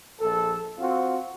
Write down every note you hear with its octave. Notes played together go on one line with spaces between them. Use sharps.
A#1 A4
C4 F4 F#4